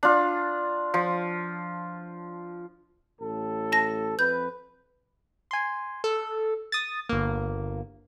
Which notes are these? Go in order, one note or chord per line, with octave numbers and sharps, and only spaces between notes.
D4 F4
F3
A1 A2 A4
A5 A#6
F2 B4 G6
G#5 C6
A4
D#6 A6
G1 A#3